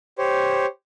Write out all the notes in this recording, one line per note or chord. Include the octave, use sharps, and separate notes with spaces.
G4 C5 C#5